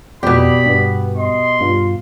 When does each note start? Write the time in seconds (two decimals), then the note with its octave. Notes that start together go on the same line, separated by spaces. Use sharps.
0.23 F2 B2 G4 D5 B5
0.66 G2 B3
1.17 D#5 C6
1.61 G2 F4